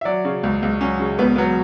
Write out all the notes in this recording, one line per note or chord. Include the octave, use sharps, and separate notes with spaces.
E5
F#3 D5
C#3
C#2
C#2
F#3 C#4
C#3
C#2 B3
F#3 B3